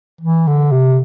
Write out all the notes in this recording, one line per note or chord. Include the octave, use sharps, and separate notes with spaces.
E3
D3
C3